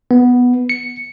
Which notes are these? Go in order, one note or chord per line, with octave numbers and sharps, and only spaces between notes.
B3
C#7